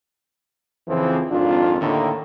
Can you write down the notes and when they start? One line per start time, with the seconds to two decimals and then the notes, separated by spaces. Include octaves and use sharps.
0.88 F2 C#3 E3 F3 C4
1.31 G#1 F2 D4 F4
1.80 D#2 A2 D3 D#3 A#3